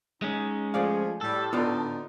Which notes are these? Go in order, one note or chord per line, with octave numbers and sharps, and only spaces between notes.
G#3 C#4 D#4
F3 A3 G#4 D5 F5
A2 G3 A4
D3 B3 D4 D#4 F4 D5